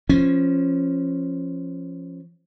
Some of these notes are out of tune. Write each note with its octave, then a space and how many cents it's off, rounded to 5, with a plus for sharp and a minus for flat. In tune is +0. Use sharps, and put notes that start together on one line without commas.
F3 -15 C#4 -20